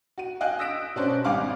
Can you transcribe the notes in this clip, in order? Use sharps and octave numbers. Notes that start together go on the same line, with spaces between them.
F#4 D#7
D#5 F5 G5 G#5 F#6
D#6 E6 A#6 B6 D7 E7
B2 C#4 D4 C5 F#6 D7
G#1 G3 F5 G#5 D6 F6